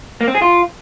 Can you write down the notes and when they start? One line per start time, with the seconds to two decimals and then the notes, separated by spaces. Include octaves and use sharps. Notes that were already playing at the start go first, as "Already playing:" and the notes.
0.21 A#3
0.28 C4
0.35 G#4
0.42 F4